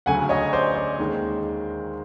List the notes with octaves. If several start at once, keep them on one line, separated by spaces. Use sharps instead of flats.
D2 C#3 F#3 A3 F#5 G#5
C#5 D#5
C5 D5
C5 D5
D#2 D#3 G#3